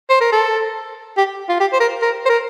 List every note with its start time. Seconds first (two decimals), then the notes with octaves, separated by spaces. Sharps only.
0.10 C5
0.21 A#4
0.32 A4
1.17 G4
1.49 F4
1.60 G4
1.73 C5
1.80 A#4
2.02 A#4
2.25 C5
2.29 A#4